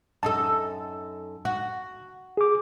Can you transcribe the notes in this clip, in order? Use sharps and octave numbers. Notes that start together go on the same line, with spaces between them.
F#2 D#4 A4 A5
F#4
G#4 D6